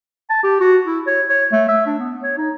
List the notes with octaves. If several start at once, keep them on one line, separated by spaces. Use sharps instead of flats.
A5
G4
F#4
E4
C#5
C#5
A3
E5
D4
B3
C#5
D#4